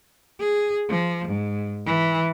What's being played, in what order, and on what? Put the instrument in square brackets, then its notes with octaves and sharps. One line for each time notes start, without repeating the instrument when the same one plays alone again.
[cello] G#4
F3
G#2
E3